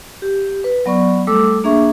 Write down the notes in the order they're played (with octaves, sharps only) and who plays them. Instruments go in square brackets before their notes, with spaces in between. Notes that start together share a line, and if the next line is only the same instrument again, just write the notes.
[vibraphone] G4
B4
F#3 B3 D5 C#6
G3 A3 A4 D6 E6
A#3 D4 G#4 E5 C#6